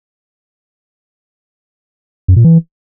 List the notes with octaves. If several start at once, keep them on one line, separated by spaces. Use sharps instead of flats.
F#2
A#2
E3